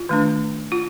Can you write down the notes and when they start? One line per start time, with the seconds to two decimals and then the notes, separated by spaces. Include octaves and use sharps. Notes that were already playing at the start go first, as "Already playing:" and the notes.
Already playing: F4
0.09 D#3 A3 D4
0.72 F4